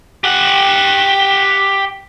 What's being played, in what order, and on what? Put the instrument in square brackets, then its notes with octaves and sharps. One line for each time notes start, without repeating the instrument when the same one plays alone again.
[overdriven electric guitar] G4 F#5